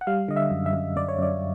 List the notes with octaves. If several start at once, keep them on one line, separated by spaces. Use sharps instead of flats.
F#5
G3 F5
D3 D#5
E5
F#2
E5
F#2
F#2 D5
C#5
F#2 D5